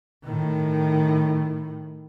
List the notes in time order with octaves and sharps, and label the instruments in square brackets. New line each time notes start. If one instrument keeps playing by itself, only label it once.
[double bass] A2 D#3